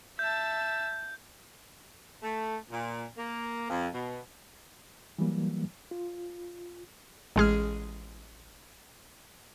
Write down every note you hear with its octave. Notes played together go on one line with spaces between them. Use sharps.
E5 A5 G6
A3
A#2
A#3
F2
B2
E3 F#3 G3 A#3
F4
A1 G#3 G#4 F6